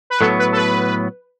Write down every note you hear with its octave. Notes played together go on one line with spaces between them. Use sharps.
B4
A2 F#3 B3 A4
B4
A4
B4